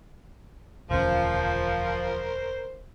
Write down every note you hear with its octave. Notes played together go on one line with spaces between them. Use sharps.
E1 D2 F3 C#4 A#4 C5